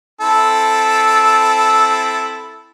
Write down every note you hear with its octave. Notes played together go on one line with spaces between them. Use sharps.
C4 E4 A4